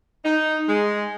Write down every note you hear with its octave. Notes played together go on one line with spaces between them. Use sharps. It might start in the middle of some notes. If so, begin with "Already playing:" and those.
D#4
G#3